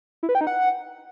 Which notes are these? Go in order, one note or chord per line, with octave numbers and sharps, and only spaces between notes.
E4
B4
G5
D#4
F#5